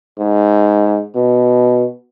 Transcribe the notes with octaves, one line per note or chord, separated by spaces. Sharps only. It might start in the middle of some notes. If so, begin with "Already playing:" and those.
G#2
B2